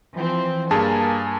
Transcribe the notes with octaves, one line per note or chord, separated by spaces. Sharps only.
E3 F3 C4
G2 A#3 G#4 G#5 A5